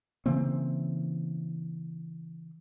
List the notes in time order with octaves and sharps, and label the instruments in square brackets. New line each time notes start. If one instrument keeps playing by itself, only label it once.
[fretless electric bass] C#3 E3 A#3 C4